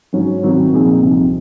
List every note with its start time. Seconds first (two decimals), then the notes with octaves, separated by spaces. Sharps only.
0.13 G#2 F#3 C#4
0.43 D#3 F#3 C4
0.73 A#2 F3 C4 D#4 G#4
1.03 C2 C3 F3 C4 D#4